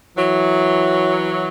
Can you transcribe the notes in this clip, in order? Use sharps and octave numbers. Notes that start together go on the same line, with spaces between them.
E3 F#3